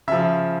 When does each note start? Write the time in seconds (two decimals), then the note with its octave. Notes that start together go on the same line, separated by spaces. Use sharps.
0.08 C#3 E5
0.12 F3